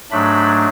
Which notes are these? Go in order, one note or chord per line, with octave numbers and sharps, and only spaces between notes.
G#2 F#3 A3 D4 B5